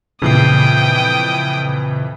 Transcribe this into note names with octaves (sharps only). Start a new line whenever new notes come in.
F2 A#2 C#3 E3 G5 D#6 C7